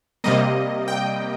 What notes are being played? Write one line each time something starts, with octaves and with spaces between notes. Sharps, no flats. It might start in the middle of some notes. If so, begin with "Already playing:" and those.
C3 G3 A#3 D#5
G5